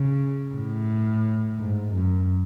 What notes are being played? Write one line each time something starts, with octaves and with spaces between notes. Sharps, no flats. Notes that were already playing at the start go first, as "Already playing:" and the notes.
Already playing: C#3
A2
G#2
F#2